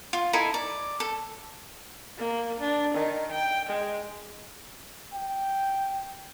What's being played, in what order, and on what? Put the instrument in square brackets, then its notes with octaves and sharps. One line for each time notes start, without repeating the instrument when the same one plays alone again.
[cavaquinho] F4
D#4 E4 A4 G#5
D5
A4
[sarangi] A#3
D4
D#3
G5
G#3
[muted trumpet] G5